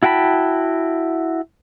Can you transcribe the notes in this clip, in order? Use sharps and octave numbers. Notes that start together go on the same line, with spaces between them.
E4 F#4 G5 A5 B5